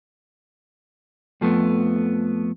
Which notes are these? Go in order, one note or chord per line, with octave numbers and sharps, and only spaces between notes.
F2 F3 A3 B3